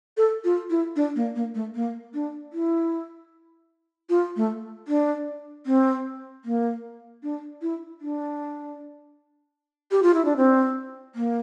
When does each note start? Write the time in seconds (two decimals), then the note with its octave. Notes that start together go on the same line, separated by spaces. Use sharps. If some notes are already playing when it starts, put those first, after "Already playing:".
0.17 A4
0.44 F4
0.70 E4
0.96 D4
1.16 A#3
1.36 A#3
1.55 A3
1.75 A#3
2.14 D4
2.53 E4
4.09 F4
4.36 A3
4.88 D4
5.66 C4
6.45 A#3
7.23 D4
7.62 E4
8.01 D4
9.91 G4
10.03 F4
10.14 E4
10.25 D4
10.37 C4
11.15 A#3